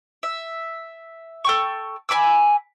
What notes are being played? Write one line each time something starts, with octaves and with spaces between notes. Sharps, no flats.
E5
A4 G5 C#6
G#5 B5 D6 E6